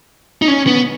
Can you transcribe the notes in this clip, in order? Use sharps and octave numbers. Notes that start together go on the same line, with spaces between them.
D#4
C#4
B3